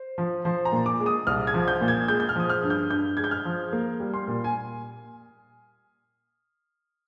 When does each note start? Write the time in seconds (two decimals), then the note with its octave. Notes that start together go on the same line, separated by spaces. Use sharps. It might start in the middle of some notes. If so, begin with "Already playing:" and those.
Already playing: C5
0.18 F3
0.45 F3 C5
0.65 A#5
0.72 A#2
0.86 D6
1.00 G#3
1.06 D#6
1.27 C2 F6
1.47 G#6
1.54 F3
1.68 G6
1.81 A#2
1.88 G#6
2.08 G#3 G6
2.20 G6
2.29 F6
2.36 F3 D#6
2.50 F6
2.63 G2
2.70 G6
2.90 G2 G6
3.17 G#3 G#6
3.24 G6
3.31 F6
3.45 F3
3.73 A#3
4.00 G3
4.14 C6
4.27 A#2
4.44 G#5